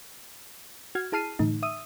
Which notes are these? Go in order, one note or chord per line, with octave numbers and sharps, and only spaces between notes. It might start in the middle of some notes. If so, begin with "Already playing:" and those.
F#4 F6 G#6
E4 G#4 A5 F6 C7 D#7
A2 D3 E3 A3 D#4
E5 D#6 E6 D#7